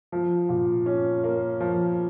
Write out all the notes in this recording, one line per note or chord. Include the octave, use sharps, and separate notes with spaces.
F3
A#2
C#4
A#3
F3